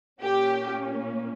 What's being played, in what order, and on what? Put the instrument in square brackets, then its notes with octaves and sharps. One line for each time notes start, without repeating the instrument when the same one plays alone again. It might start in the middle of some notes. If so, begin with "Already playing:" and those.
[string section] A#2 A#3 C#4 G4